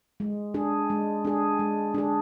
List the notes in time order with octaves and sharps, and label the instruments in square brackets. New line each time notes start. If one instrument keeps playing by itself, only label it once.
[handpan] G#3
D4 G#4
G#3
D4 G#4
G#3
D4 G#4